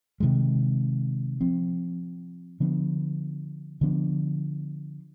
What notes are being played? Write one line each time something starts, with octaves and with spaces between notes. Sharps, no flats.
C3 D#3 G#3
F3 C4
D3 F3 B3 D4
D3 F3 B3 D4